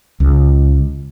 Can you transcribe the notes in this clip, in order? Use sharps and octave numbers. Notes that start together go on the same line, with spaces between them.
C#2